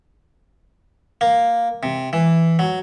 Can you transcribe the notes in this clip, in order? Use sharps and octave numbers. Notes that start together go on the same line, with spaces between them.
A#3
C3
E3
F#3